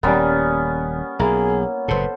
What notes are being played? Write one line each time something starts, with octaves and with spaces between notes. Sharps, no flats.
D#1 G3 A#3 B3 C#4
B1 A#3 E4 G#4
F#1 A2 A4 B4 C5